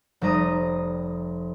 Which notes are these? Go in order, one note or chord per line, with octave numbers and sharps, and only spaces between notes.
F1 G3 A#5 D#6